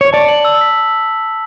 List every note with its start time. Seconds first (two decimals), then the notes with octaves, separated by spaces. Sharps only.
0.01 C#5
0.13 D5 A5
0.28 F#7
0.45 E6
0.61 B6